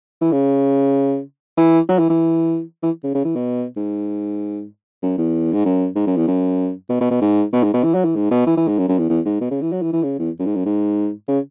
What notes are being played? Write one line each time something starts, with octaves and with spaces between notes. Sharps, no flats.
E3
C#3
E3
F#3
E3
E3
E3
C#3
C#3
E3
B2
G#2
F#2
E2
G#2
F#2
G#2
F#2
E2
F#2
B2
B2
B2
G#2
B2
G#2
B2
E3
F#3
E3
G#2
B2
E3
E3
G#2
F#2
F#2
E2
E2
G#2
B2
C#3
E3
F#3
E3
E3
C#3
E2
F#2
G#2
F#2
G#2
C#3